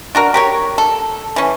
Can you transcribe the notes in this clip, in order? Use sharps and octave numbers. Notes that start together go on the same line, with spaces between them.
D4 F#4 A#4
G4 A#4 C#5
A4
E3 C#4